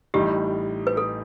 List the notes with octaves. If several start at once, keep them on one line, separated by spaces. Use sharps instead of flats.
A1 A2 G3 D#4 G4
B4
A4